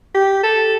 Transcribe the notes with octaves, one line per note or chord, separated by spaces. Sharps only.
G4
A4